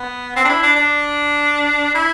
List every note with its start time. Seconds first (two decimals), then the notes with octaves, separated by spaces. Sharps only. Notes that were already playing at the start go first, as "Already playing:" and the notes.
Already playing: B3
0.36 C4
0.45 D4
0.49 E4
0.63 D4
0.76 D4
1.95 E4